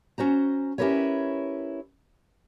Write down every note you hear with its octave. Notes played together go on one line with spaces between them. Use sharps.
C#4 F#4 C5 A#5
C#4 E4 G4 A#4 B4 C#5